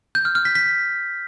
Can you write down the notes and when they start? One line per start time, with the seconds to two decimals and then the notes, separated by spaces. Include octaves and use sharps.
0.15 G6
0.25 F6
0.35 F6
0.45 B6
0.55 B6